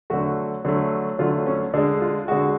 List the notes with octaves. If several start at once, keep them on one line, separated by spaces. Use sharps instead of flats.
D3 F#3 A3 F#4
D3 F#3 A3
D3 F#3 A3 F4
C#4
D3 G#3 D4
F4
D3 G#3 F#4